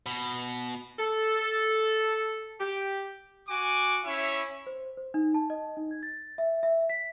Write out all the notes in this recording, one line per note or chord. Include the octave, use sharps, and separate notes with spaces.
B2
A4
G4
F#4 G#5 D6
C#4 E4 C#5 E5
C5
C5
D#4
A5
D#5
D#4
G#6
A6
E5
E5
B6